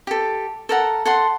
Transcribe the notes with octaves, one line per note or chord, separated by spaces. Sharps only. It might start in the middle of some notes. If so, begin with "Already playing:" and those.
G4 A4
A4 A#4 F#5
A4 F#5 C6